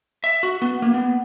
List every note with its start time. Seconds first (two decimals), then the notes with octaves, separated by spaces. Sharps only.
0.24 E5
0.43 F#4
0.62 B3
0.82 A#3
0.94 B3